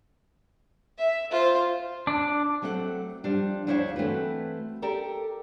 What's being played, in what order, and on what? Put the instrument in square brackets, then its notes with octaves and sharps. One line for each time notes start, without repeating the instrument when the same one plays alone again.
[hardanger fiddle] E5
F4 C5
[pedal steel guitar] D4
[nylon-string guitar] F#3 A3 C4 A#4 F#5
F3 G3 D4
D2 D4 E4 C5 C#5 F5
E3 A3 C4 F#4 B4
G4 A4 A#4 D5 G5